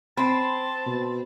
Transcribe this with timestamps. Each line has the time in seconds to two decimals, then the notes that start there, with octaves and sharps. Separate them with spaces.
0.17 C4 A5 B5 C6
0.86 B2